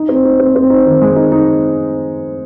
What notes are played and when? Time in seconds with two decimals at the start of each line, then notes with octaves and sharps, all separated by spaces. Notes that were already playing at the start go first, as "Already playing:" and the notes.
Already playing: D#4
0.09 C4
0.25 D#4
0.39 C4
0.55 C4
0.70 D#4
0.86 D#3
1.01 G#3
1.16 D#4
1.32 D#4